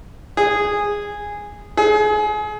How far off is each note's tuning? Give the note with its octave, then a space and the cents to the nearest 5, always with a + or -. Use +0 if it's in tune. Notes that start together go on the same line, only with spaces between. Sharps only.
G#4 -10
G#4 +30